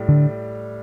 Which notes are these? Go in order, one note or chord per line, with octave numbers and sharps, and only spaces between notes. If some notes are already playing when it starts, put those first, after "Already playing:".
Already playing: A2 G3
D3